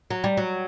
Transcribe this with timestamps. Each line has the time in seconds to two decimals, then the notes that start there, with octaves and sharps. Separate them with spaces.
0.11 F#3
0.24 G3
0.37 F#3